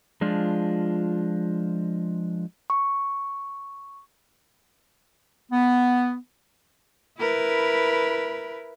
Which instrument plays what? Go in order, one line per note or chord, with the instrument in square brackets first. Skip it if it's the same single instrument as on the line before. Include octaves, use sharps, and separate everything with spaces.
[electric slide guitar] F3 G#3 D4 F4
[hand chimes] C#6
[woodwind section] B3
[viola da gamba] E4 A#4 B4